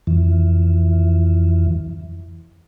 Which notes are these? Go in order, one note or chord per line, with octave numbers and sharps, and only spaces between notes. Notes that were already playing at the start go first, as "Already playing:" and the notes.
F2 E3